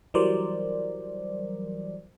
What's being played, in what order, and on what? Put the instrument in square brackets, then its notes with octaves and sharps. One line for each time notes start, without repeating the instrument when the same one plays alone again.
[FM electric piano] E3 F#3 G3 A#4 C5 D5